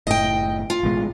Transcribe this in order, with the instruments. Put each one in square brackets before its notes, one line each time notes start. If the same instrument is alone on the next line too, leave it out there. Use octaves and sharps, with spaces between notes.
[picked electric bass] F#1 A2 [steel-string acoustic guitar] D#5 G5
[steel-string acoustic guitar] F4
[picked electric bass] A1 B2 G#3